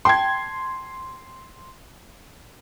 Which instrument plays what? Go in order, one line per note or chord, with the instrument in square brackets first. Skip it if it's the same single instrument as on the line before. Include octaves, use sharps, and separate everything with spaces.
[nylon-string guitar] G5 A5 [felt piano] C6 G#6